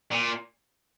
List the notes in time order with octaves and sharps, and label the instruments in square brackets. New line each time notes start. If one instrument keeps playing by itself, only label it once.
[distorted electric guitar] A#2